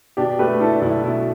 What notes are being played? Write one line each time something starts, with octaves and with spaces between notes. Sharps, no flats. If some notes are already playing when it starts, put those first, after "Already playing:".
B2 D4 G4
A3 G4 B4
D4 E4 A4
D4
B1 E4
B2 E4